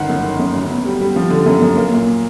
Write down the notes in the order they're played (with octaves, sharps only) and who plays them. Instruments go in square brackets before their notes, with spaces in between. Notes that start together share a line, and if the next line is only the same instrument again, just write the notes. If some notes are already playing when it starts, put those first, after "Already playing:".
Already playing: [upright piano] G1 D#3 F#5
F#2
D#3
F#2
D2
B3
G3
G3
F3
D3
F#2
F#2
A#3
A#2